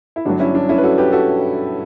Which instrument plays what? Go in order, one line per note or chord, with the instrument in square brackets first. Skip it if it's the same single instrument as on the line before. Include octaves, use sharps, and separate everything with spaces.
[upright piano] E4
G1 G2 F#3 D4 F#4
C#4 E4
D4
C#4 E4
B4
F#4 A4
G4 B4
F#4 A4